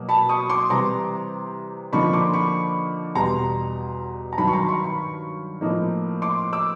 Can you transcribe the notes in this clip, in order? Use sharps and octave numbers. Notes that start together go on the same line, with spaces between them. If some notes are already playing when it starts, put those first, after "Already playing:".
Already playing: B2 F#3 A#3
A5 B5
C#6 D#6
C6 D6
C3 E3 G3 A#5 C6
D3 F3 A#3 D#4 B5 C#6
C6 D6
B5 C#6
E2 B2 G3 A#5 C6
A#5
G2 D#3 F#3 A5 B5
C#6
A#5 C6
B5 C#6
B5 C#6
A2 F3 A#3 D#4
C6 D6
D6 E6